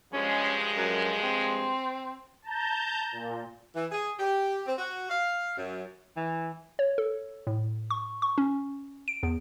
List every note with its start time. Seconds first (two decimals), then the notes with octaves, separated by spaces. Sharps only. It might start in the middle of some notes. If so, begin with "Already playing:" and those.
0.13 G2 F3 G#3 C#4
0.77 F#2
1.23 C4
2.42 A5 A#5 G6
3.12 A#2
3.76 E3
3.92 G#4
4.19 G4
4.66 C4
4.78 F#4
5.10 F5
5.57 F#2
6.17 E3
6.79 C#5
6.98 A4
7.47 A2
7.90 C#6
8.22 C#6
8.38 C#4
9.08 D7
9.23 E2